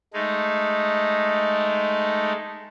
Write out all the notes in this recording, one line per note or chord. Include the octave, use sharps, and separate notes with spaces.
G#3 A3 D#4